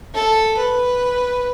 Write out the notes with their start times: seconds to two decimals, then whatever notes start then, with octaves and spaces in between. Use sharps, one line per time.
0.15 A4
0.57 B4